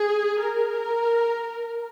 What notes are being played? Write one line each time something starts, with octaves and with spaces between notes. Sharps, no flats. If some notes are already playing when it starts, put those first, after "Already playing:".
Already playing: G#4
A#4